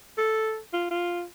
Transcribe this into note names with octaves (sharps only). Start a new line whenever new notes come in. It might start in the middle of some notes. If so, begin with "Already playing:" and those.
A4
F4
F4